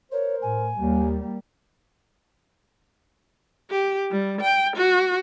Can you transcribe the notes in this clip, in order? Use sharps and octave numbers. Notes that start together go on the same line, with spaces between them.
A#4 C5 C#5
A2 G#5
D#2 G3 A#3
G4
G3
G5
F#4